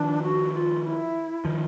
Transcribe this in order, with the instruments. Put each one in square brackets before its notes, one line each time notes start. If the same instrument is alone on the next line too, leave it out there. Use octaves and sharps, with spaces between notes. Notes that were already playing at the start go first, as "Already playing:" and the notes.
Already playing: [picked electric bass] D#3 F3 [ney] D4
[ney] F#4
F4
E4
[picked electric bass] D#3 F3